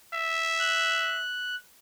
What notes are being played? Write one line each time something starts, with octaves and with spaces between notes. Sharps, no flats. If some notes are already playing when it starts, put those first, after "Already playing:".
E5
F#6